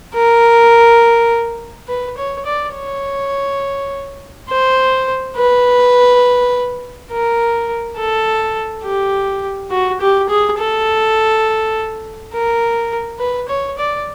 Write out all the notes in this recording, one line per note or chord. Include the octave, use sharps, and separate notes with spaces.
A#4
B4
C#5
D5
C#5
C5
B4
A#4
A4
G4
F#4
G4
G#4
A4
A#4
B4
C#5
D5